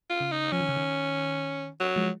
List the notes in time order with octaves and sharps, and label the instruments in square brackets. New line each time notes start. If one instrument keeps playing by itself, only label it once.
[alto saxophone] F4
[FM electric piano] C#3
[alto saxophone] D#4
[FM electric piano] F3 [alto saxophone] C#4
[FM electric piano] D#3
C#3
D#3
[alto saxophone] F#3
[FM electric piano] F3 G#3